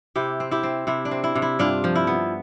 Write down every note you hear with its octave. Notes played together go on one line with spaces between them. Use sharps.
C3 E4 G4
C4
E4 G4
C4
C3 E4
D4
C4
E4
C3
E4
G2 D4 F4
F3
E4
B3